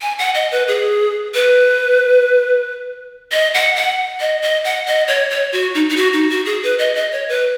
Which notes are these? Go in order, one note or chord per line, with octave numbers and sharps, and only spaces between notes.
G#5
F#5
D#5
B4
G#4
B4
D#5
F#5
F#5
D#5
D#5
F#5
D#5
C#5
C#5
F#4
D#4
D#4
F#4
D#4
F#4
G#4
B4
D#5
D#5
C#5
B4